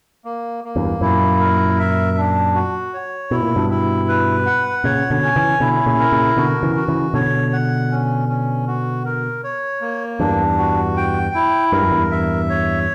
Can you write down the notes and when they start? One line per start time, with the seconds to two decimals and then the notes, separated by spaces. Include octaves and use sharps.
0.25 A#3
0.64 A#3
0.76 E2 G2
1.01 F#2 A#2 E4
1.40 A#4
1.79 E5
2.17 D4
2.55 F#4
2.94 C#5
3.31 B2 E4
3.43 A#2
3.56 G2 B2
3.70 E4
4.09 B4
4.46 F#5
4.84 A#2 C#3 C#5
5.11 B2 D3
5.23 C#4
5.36 C#3 E3
5.60 B2 D3 E4
5.86 A#2 C#3
5.99 A#4
6.12 A#2 C#3
6.37 B2 D3 F#4
6.63 C#3 E3
6.76 F#4
6.88 C#3 E3
7.14 B2 D3 C#5
7.53 F#5
7.91 C#4
8.29 C#4
8.67 F#4
9.05 A#4
9.44 C#5
9.81 A#3
10.20 E2 G2 D4
10.58 F#4
10.97 G5
11.35 E4
11.72 G2 A#4
11.82 F#2
11.91 E2 G2
12.11 E5
12.50 C#5